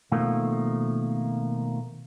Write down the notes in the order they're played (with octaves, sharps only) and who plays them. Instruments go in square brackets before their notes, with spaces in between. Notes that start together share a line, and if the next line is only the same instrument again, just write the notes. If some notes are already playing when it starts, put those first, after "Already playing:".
[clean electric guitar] B2 D#3 F3 A3 A#3